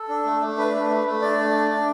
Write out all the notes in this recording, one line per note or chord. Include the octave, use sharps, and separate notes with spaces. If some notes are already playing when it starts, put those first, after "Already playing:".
Already playing: A4
D4
A3
A3
D4 B4
A3
A3
A3
D4 D5
A3
D4
D4